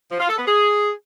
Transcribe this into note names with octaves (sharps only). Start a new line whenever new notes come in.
F3
F4
A4
B3
G#4